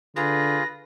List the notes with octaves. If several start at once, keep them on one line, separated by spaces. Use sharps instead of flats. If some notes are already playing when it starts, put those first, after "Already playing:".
D3 F4 G#4 B4 A#6